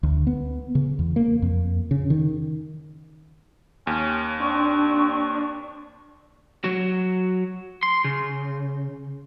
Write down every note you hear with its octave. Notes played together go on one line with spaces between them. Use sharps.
D2
B3
C#3
E2
A#3
F2
C#3
D#3
D#2 C#4
C4 D4 C#6
F#3 F#4
C6
C#3